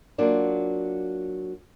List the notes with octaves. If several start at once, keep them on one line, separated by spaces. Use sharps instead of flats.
F#3 A#3 D4 F4